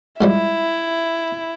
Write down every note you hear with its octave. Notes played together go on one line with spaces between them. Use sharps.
G#2 F3 G3 E4